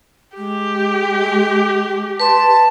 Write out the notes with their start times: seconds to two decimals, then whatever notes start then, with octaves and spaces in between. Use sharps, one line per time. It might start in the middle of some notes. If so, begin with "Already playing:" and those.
0.38 G#3 G4
2.20 B4 A5 C6